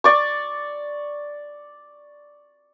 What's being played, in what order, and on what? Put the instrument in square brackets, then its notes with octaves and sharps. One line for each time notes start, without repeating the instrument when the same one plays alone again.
[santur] D5 C#6